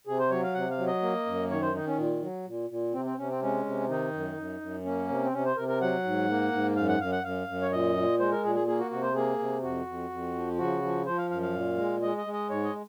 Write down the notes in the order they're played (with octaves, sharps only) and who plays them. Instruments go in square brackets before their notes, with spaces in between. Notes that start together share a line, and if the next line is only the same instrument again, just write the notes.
[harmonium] C3 G#4
C5
F#3 C#5
F5
C3 F#5
F5
F#3
D#5
A#3
F#2
D#3 C#5
C5
D#3 D#4
C#4
A#2
F#3
A#2
A#2
C3 C4
C4
C3 C#4
C4
G#3 C#4
C3
D#3 D#4
F#2
F#2
F#2
A#3 C#4
C3
C4
C3 C#4
C5
C3 A#4
A#4
F#3 F#5
G#2
A#3
G#2
F#2 F5
F#5
F#2 F5
F#5
F#2 F5
F#2
C#5
A#2 D#5
A#2
G#3 C5
A#4
A#2 G#4
G#4
A#3 G#4
F#4
C3 F#4
C5
A#3 G#4
C3
F2 F#4
F2
F2
F3
C#3 F#4
F3
F3 C5
F5
F#2 F5
F5
A#2
G#3
G#3 D#5
D#5
G#3
D#5
G#2 C#5
D#5